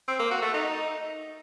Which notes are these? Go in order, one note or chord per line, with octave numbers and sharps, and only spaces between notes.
C4
A#3
F#4
A3
D#4